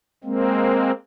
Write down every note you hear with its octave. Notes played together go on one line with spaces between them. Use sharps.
G#3 A#3 C4